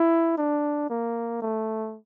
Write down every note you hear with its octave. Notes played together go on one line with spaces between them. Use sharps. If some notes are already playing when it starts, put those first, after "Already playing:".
Already playing: E4
D4
A#3
A3